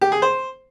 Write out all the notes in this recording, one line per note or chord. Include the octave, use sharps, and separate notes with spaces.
G4
G#4
C5